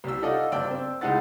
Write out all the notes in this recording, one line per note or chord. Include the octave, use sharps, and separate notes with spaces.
C2 G3 E6
D#4 F4 A4 D5 D#5 F#5
F#1 G2 D5 G5 E6
C4
C#2 G#3 D#4 E4 F#5 A6